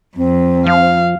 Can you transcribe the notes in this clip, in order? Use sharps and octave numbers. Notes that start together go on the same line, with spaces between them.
F2 C4
F3 F5